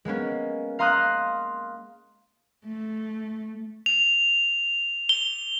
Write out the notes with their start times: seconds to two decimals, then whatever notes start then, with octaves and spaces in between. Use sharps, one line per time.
0.05 G#3 A#3 B3 C#4
0.79 F5 A#5 C6 D#6 F6 F#6
2.66 A3
3.86 F7
5.09 G7